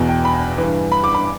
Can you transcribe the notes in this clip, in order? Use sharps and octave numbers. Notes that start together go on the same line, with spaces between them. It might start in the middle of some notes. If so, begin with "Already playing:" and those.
Already playing: E2 B2
G5
B5
G2 E3
B5
D6
B5